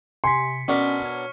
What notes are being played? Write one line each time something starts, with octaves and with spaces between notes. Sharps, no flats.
C3 G#5 C6 B6 C#7
B2 C#4 D4 A#4 C#6 F6 B6
C#5